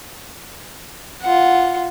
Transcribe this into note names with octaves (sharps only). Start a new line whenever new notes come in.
F4 F#5